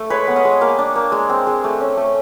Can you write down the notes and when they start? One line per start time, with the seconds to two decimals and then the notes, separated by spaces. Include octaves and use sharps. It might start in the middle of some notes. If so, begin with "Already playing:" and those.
Already playing: A3
0.10 G#3 B4 C#5
0.27 B3 F#5
0.36 D#5 F5
0.45 G#3
0.61 A#3 F5 G5
0.78 D4
0.95 A#3
1.12 G#3
1.29 C4
1.47 G#3
1.64 A3
1.81 C#4
1.97 A3